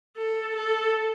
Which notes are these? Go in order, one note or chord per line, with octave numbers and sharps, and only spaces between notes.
A4
A4